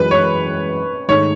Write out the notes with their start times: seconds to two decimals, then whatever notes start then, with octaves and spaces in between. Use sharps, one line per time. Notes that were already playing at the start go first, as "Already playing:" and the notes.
Already playing: F#2 E3 G#3 C#4 F#4 B4
0.11 C#5
1.08 G#2 D#3 A3 D#4 G#4 C#5